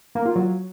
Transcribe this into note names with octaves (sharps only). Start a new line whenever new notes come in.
A#3
F4
F#3